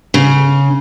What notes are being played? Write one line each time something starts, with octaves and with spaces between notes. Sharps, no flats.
C#3